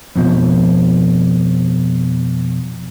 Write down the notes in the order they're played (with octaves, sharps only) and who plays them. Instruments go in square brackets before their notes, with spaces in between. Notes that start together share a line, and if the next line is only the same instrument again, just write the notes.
[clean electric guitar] F2 B2 F3